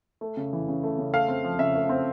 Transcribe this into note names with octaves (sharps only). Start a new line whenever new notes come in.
A3
C#3
E3
C#3
A3
C#3
A3 F5
C4
F3
C#3 E5
A3
C4